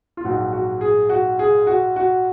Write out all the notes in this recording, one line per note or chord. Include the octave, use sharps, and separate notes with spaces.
F4
A#1 G#2 F#3 F#4
F#4
G#4
F#4
G#4
F#4
F#4